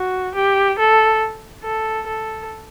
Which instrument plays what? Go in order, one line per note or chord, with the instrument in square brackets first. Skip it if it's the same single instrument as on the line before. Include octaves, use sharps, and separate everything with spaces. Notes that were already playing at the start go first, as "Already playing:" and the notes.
Already playing: [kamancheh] F#4
G4
A4
A4
A4